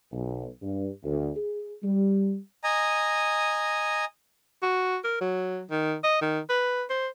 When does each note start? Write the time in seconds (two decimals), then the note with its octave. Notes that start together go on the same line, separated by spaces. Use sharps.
0.12 B1
0.61 G2
1.04 D2
1.36 G#4
1.83 G3
2.63 D#5 G#5 A#5
4.62 F#4
5.04 A#4
5.21 F#3
5.71 D#3
6.04 D#5
6.21 D#3
6.49 B4
6.90 C5